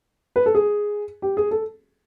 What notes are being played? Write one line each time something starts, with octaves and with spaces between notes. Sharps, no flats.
B4
A4
G#4
G4
G#4
A4